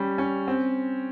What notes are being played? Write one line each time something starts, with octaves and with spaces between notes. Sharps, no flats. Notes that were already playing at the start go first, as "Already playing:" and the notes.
Already playing: G3 C#4
C#4
C4